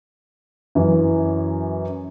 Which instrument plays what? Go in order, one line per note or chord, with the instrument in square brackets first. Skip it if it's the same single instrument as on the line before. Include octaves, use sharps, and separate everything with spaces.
[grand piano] F#2 E3